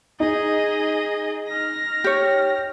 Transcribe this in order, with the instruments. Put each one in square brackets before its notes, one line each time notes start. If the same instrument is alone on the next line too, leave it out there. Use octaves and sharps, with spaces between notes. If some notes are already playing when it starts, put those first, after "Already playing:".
[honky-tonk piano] D#4 [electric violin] G#4 D#5
[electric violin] F6 A#6
[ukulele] G4 C#5